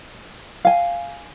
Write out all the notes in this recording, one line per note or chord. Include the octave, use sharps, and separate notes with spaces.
F5 G#5